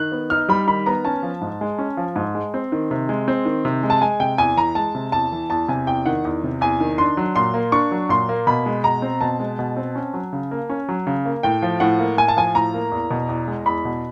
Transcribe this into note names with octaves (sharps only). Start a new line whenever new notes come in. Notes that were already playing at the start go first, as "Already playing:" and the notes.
Already playing: D#3 F#6
B3
D#4 F6
G3 B5
D#3 B5
B3 A#5
C#4 A5
F3
G#2
G#3
C#4
F3
G#2
G#3
C4
D#3
C3
G#3
C4
D#3
C3
G#3
A5
G#3 G#5
C3 G5
E2 G#5
E3 A#5
G#3 A5
C3
E2 A5
E3
E2 A5
C3 G#5
E2 G5
D#3 F#5
E2
C3
E2 G#5
D#3
D4 C6
F#3
A#2 C6
A#3
D4 C#6
F#3
A#2 C6
A#3
B2 B5
G#3
B2 A#5
C4
B2 A5
G#3
B2
C4
C#4
F#3
C#3
A#3
C#4
F#3
C#3
A#3
A2 G5
F3
A2 F#5
A#3
A2 G#5
A5
F3 G#5
A2 A#5
A#3
E2
B2
E2
G#3
E2 B5
B2